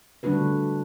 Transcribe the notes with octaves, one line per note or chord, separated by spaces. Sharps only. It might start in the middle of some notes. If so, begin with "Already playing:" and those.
D3 G3 A3 D4 F#4 B4